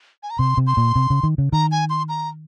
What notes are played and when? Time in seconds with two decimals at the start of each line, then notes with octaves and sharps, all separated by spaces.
0.23 G#5
0.30 A#5
0.39 C3 C6
0.57 C3
0.67 C6
0.77 A#2
0.96 C3
1.10 C#3
1.23 D#3
1.38 C#3
1.52 D#3 A#5
1.72 G#5
1.90 C6
2.09 A#5